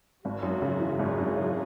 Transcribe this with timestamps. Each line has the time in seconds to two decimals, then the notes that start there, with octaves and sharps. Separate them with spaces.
0.25 G#1 F#4
0.43 F#2
0.62 C#3
0.80 E3
0.99 G#1 G#4
1.18 F#2
1.36 C#3